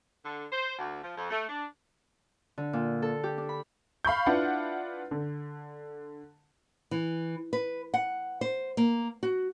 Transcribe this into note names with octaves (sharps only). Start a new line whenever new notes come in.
D3
C5
D2
F3
F2
A3
D4
D3
A#2
A4
G4
D4
B5
F5 B5 C#6 G6
D4 E4 F4 B4 F#5
D3
E3
B4
F#5
C5
A#3
F#4